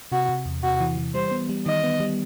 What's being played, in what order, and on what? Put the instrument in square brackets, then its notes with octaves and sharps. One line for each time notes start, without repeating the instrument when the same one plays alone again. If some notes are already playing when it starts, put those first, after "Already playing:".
[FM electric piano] C3 [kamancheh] F#4
[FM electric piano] C3
E2
[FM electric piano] C3 [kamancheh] F#4
[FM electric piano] E3
E3
[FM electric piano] G3 [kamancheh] C5
[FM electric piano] B3
G3
[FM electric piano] D#3 [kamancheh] D#5
[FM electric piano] B3
G3